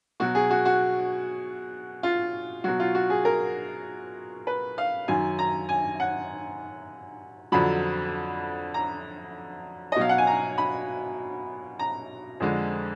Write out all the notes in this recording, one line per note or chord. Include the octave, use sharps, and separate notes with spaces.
B2 F#3 F#4
G#4
F#4
F#4
F4
B2 F#3 F#4
F4
F#4
G#4
A#4
B4
F5
F#2 D#3 F#3 G#5
A#5
G#5
F#5
F2 D3 F#3 B5
A#5
D#5
B2 F#3 F5
F#5
G#5
A#5
B5
A#5
F2 D3 G#3